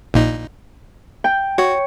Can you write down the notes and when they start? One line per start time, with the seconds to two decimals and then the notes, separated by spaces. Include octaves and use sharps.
0.14 A#1 A#2 D#4
1.24 G5
1.58 F#4 C#5